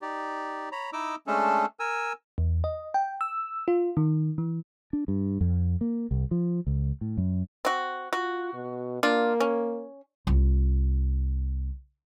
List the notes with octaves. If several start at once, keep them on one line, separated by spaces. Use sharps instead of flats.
D#4 G4 D5
C#5 A#5 B5
D#4 E4 D#5 D6 E6
G#3 A3 C#4 D4 A4
A#4 G#5 E6
E2
D#5
G5
E6
F4
D#3
E3
D4
G2
F2
A#3
C2
F3
C#2
A2
F#2
C4 F#4
F4 F#4
B2
A#3 D4 F4
C#4
C2 F4